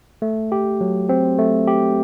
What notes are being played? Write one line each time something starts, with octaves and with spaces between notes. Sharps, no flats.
A3
G4
F#3
C4
A3
G4